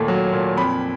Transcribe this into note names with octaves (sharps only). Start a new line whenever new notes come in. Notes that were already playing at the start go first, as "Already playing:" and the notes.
Already playing: D#2 A#2 A3
F#3
A#2
F2 B5